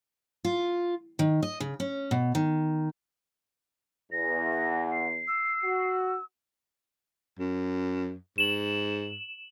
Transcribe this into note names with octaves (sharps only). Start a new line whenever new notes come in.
F4
D#3
D#5
C#3
C#4
B2
D#3
E2 A#6
F#5
C7
E6
F#4
F#2
G#2 E7 F#7